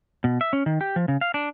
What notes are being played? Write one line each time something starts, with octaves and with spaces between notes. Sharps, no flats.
B2
E5
C#4
D#3
G4
F3
C#3
F5
D4